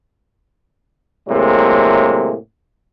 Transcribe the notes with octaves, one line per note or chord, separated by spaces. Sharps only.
A2 C3 F#3 G#3 A#3